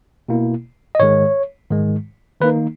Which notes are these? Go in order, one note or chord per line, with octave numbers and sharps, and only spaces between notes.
B2 A#3 E4
D#5
G#2 D#3 G#3 C#5
G#2 D#3 G#3
D#3 A#3 D#4 B4